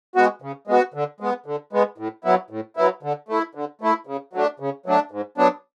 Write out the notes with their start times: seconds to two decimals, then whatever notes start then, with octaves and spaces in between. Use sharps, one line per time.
0.15 G#3 B3 F#4
0.42 C#3
0.67 G#3 B3 F#4
0.94 D3
1.20 G#3 B3
1.46 D3
1.73 G#3 B3
1.98 A2
2.24 F#3 B3 E4
2.50 A2
2.77 F#3 B3 E4
3.03 D3
3.29 A3 E4
3.55 D3
3.81 A3 E4
4.07 C#3
4.33 F#3 A3 D4
4.60 C#3
4.86 F#3 A3 D4
5.11 G#2
5.38 F#3 B3 D4